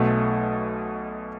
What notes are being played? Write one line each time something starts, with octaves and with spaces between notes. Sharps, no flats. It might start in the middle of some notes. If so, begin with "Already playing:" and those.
Already playing: B1 B2 A3